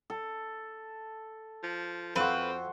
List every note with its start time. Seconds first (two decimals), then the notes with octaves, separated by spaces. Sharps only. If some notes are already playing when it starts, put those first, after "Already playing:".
0.10 A4
1.63 F3
2.16 F2 C4 F#4 B4 C5